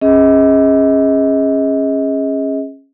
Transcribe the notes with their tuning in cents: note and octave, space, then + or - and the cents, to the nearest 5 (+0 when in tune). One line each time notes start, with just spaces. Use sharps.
C#4 -20 G#4 -5 D#5 +35